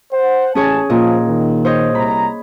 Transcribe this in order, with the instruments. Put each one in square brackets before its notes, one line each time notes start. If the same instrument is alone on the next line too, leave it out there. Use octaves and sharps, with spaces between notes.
[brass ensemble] C5 F#5
[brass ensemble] A1 G#5 A5 [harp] C#4 G#4 C#5
[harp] A#2 D#5 [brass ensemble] F3
[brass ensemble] D#3
[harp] C5 C#5 D#5
[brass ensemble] C2 C3 A#5 [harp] B5